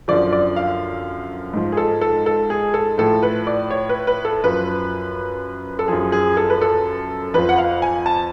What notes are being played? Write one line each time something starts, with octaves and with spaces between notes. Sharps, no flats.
F#2 D3 F3 D5
D5
F5
G#2 F3
G#4
A4
A4
A4
G#4
A4
A2 F3 A4
B4
D5
C#5
B4
B4
A4
F#2 F3 B4
A4
F#2 F3 G#4
G#4
A4
B4
A4
F2 F3 B4
F#5
F5
G#5
A5